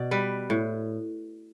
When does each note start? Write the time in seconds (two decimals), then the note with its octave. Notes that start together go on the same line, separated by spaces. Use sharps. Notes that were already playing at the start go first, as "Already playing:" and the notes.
Already playing: B2 D5
0.11 G3 B4
0.50 A2